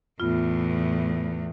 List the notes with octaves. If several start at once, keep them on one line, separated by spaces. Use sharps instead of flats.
E2 A2 B3 F4